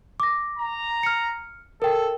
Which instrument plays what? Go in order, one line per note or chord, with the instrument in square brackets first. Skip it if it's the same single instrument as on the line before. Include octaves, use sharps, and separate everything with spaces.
[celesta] D6 A#6
[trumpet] A#5
[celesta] F6 C#7
[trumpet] A4 [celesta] A#4 G5